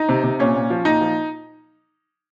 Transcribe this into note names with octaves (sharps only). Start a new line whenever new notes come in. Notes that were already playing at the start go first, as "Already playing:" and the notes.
Already playing: D#4
C3
C3
A#2 C#4
A#2
F3
A#2 D#4
F3